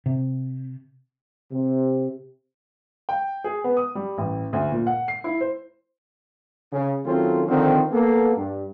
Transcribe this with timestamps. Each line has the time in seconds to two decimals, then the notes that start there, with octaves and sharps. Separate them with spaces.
0.06 C3
1.51 C3
3.09 G5
3.44 G#4
3.64 B3
3.77 D#6
3.95 G3
4.18 A1
4.53 D2
4.72 A#2
4.87 F#5
5.08 C7
5.24 E4
5.41 C5
6.72 C#3
7.04 D#3 F#3 A3 C4 C#4 F4
7.48 D3 D#3 F3 C4
7.91 A#3 B3 A4
8.36 G2